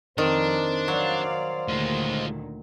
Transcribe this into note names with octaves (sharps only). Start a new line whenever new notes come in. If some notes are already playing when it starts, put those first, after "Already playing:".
F2 D#3 D4 C5
F#3 D5 F5
D2 A#2 D#3 G#3 F4